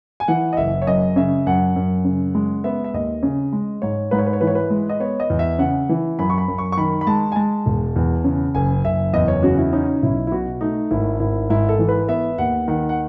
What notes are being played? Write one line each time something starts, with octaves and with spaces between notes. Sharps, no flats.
G#5
E3 F#5
D#5
F#1 E5
C#5
F#2 D#5
C#3 E5
F#2 F#5
F#2
C#3
G#3
B3 E5
E5
D#2 D#5
C#3
G#3
G#2 C#5
G#2 B4
C#5
B4
C#5
E3 B4
C#5
B4
G#3
D#5
B3 C#5
D#5
E2
E5
C#3 F#5
E3
F#2 B5
C#6
B5
F#2
C#6
C#6
D#3 B5
B5
G#3 A5
G#5
G#3 A5
E1
E2
C#3
F#1 G#5
F#1 E5
E2 D#5
C#5
C#3 F#4
E4
C#4 D#4
B1 E4
E4
B2 F#4
A3 D#4
G#1 E4
G#1 E4
G#2 E4
A4
E3
B4
B3 E5
D#2 F#5
D#3 F#5
F#5